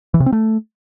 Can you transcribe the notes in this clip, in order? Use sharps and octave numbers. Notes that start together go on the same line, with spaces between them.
E3
C3
C4
A3